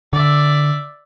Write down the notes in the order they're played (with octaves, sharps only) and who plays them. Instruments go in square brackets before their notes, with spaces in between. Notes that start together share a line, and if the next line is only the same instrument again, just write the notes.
[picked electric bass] D3 [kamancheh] D5 E5